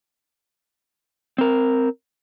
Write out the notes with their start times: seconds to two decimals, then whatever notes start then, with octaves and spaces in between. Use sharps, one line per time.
1.38 C4 A#4